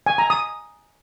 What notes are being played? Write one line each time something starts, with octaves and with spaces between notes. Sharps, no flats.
G#5
A#5
D#6